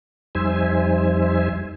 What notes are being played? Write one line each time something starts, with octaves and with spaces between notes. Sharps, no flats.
F2 G3 D#4 C5 E5 G#5